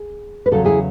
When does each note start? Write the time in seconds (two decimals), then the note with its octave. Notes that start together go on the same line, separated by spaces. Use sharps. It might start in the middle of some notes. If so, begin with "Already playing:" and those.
Already playing: G#4
0.46 B4
0.51 E2 C#3 F#3 F#4 A4
0.64 E4 G#4